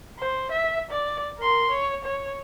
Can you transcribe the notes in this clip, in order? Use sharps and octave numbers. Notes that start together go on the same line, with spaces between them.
C5
E5
D5
A#4 C6
C#5
C#5